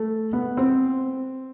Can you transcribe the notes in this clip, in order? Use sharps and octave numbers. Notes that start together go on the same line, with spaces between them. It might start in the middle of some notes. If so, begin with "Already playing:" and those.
Already playing: A3
B3
C4